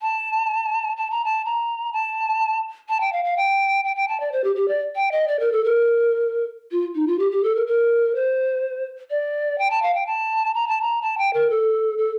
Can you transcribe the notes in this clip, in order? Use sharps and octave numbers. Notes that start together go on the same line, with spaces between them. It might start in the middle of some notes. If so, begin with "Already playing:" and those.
A5
A5
A#5
A5
A#5
A5
A5
G5
F5
F5
G5
G5
G5
A5
D5
C5
G4
G4
D5
G5
D#5
D5
A#4
A4
A#4
F4
D#4
F4
G4
G4
A4
A#4
A#4
C5
D5
G5
A5
F5
G5
A5
A#5
A5
A#5
A5
G5
A#4
A4
A4